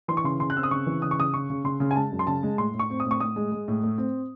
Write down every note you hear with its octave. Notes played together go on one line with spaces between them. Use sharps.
E3 C6
C#6
C#3 C6
C#3 C6
F#6
C4 E6
D#6
C#3 C#6
E3
C#3 D#6
C#6
C#3 D#6
C#3 C#6
C#3
C#3 C6
C#3
G#5
G#3 A5
F#2
C6
C#3 A5
G#3
A2 C6
A2
C#6
C4
D#6
A2
C#6
A2 D#6
G#3
G#3
A2
A3
C4